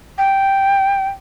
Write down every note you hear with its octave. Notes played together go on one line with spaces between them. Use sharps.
G5